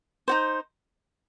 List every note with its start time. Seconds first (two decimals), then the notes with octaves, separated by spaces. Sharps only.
0.28 D#4 F#4 C5